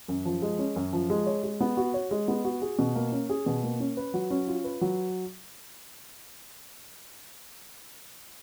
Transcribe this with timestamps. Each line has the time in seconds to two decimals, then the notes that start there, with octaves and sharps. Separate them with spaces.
0.08 F#2
0.25 F3
0.42 G#3
0.59 C#4
0.76 F#2
0.93 F3
1.10 G#3
1.26 C#5
1.43 G#3
1.61 B3
1.77 F#4
1.94 C#5
2.11 G#3
2.28 B3
2.45 F#4
2.62 G#4
2.79 B2
2.96 A#3
3.12 C#4
3.30 G#4
3.46 B2
3.63 A#3
3.80 C#4
3.97 B4
4.14 F#3
4.31 C#4
4.48 F4
4.64 B4
4.81 F#3